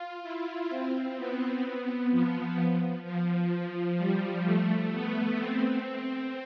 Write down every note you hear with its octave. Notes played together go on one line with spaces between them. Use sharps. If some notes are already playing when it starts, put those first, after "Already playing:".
Already playing: F4
E4
C4
B3
B3
F3
F3
G3
A3
B3
C4